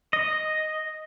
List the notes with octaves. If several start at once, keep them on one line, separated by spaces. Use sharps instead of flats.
D#5